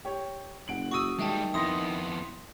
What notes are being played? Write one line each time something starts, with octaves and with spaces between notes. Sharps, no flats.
G4 C#5
F#1 F#5 D7 F#7
F#4 C#6 D#6 E6 D#7
D#3 G3 G#3 E5 G5 A5
F2 B3 E4 C6 D#6 A#6